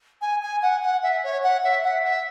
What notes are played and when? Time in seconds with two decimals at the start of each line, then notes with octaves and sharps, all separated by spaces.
0.22 G#5
0.42 G#5
0.63 F#5
0.83 F#5
1.03 E5
1.24 C#5
1.43 F#5
1.64 E5
1.84 F#5
2.05 E5